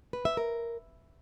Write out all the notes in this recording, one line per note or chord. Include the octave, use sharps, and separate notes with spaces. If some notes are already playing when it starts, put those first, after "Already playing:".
B4
E5
A#4